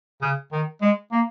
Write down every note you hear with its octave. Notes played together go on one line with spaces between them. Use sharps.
C#3
D#3
G#3
A#3